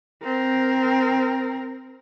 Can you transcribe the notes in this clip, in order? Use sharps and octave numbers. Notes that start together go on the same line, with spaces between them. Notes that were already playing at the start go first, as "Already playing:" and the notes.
C4 A#4